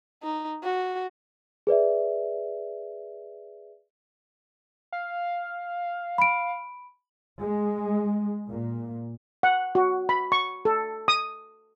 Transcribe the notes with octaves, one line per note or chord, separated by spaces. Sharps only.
D#4
F#4
G#4 B4 D5 E5
F5
B5 D7
G#3
A#2
F#5
F#4
B5
C#6
A4
D#6